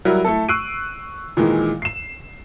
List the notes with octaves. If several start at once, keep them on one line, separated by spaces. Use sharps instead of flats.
F#3 G3 E4 F#4 A#4
A3 E4 A4
C#6 E6 F#6 C7 D7 D#7
A#2 D#3 E3 G#3
C7 E7